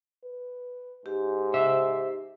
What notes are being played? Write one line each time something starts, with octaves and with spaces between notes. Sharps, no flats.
B4
G#2 G4
C5 E5